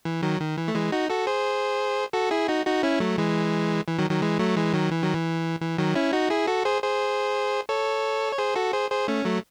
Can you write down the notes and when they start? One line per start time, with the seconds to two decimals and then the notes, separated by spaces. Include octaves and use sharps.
0.05 E3
0.23 D#3 F#3
0.40 D#3
0.57 E3
0.68 A3
0.74 E3 G#3
0.92 D#4 F#4
1.10 F#4 A4
1.27 G#4 C5
2.13 F#4 A4
2.31 E4 G#4
2.48 D#4 F#4
2.66 D#4 F#4
2.83 C#4 E4
3.00 F#3 A3
3.18 E3 G#3
3.87 E3
3.99 D#3 F#3
4.10 D#3 F#3
4.22 E3 G#3
4.39 F#3 A3
4.57 E3 G#3
4.74 D#3 F#3
4.91 E3
5.03 D#3 F#3
5.14 E3
5.61 E3
5.78 D#3 F#3
5.95 C#4 E4
6.13 D#4 F#4
6.30 E4 G#4
6.47 F#4 A4
6.65 G#4 C5
6.82 G#4 C5
7.69 A4 C#5
8.33 C#5
8.38 G#4 C5
8.55 F#4 A4
8.73 G#4 C5
8.90 G#4 C5
9.08 A3 C#4
9.25 F#3 A3